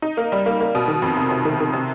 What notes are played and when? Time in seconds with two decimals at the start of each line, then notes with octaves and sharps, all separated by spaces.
0.02 D#4
0.17 A#3
0.32 G3
0.46 A#3
0.60 A#3
0.75 B2
0.88 D#3
1.02 F2
1.16 C3
1.31 C3
1.45 D#3
1.60 D#3
1.73 C3